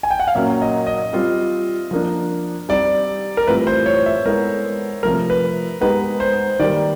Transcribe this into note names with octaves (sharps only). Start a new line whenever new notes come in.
G#5
G5
F#5
F5
A#2 F#3 A#3 C#4 E5
D#5
D#5
G3 C4 F4
F3 A#3 D4
G3 C4 D#4 G4 D5
A#4
A2 E3 G3 C4 F4 B4
C5
C#5
E5
G#3 B3 E4 A4 A#4
C3 F3 A3 A#4
B4
G#3 B3 D#4 G4 B4
C5
D#3 G3 A#3 D5